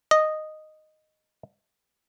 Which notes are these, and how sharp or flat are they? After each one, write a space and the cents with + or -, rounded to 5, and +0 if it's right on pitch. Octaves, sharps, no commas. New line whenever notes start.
D#5 -5